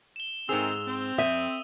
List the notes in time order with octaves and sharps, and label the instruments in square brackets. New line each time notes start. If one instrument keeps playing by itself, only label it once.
[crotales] E7 G7
[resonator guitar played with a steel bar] G#2 G#4 [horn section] D#3 C4 [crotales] E6 F7
[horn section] C4
[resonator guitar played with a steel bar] F2 [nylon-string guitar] E5 [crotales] D#6 D#7